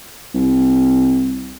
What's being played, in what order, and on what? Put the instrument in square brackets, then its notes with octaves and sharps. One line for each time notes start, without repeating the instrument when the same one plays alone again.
[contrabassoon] C2